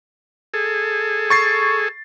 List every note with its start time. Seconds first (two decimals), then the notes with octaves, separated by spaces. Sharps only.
0.54 G#4 A4
1.30 C#6 A6 C7